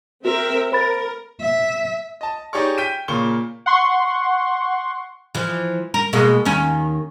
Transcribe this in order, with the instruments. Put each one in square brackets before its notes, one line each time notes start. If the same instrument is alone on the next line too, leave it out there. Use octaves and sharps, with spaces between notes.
[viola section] C4 A#4 E5 [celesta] F#4
[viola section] A#4 [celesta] C5 B5 A6
[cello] E5
[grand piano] D#5 A5
D#4 G4 G#4 C#5 D5 C#6
G5 G6 B6 D7 D#7
A#2 C#3 A#3 C#6 G7
[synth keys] F#5 C6 C#6
[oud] E3 F3
A#4
B2 G#3 A#3
D#2 D#3 C#4